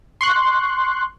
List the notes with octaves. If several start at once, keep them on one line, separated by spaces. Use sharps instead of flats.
C6 C#6 F#6